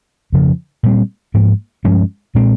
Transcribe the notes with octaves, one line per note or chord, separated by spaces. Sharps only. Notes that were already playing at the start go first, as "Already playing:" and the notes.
F2 C#3 F3
A#2 G3 C4
G#2 F3 A#3
G2 F3 G#3 C#4
A#2 G#3 C4